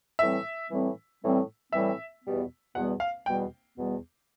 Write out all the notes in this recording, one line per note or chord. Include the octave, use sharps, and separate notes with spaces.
A2 E3 G3 C4 E5
A2 E3 G3 C4
A2 E3 G3 C4
A2 E3 G3 C4 E5
E2 B2 G3 B3
E2 B2 G3 B3 F#5
F5
E2 B2 G3 B3 G5
E2 B2 G3 B3